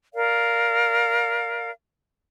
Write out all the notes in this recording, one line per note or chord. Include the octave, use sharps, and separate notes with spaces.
A#4 D5 F5